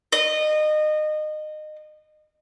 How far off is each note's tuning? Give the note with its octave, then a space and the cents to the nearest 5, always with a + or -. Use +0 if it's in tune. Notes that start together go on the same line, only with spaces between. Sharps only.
D#5 -25